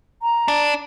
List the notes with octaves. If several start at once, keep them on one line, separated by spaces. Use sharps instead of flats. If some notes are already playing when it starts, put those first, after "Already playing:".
A#5
D4